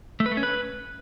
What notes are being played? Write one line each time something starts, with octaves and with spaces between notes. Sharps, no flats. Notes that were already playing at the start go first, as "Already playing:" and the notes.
A3
B4
A3
C#4
B4